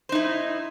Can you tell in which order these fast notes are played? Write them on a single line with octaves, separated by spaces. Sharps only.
C5 D#4 E4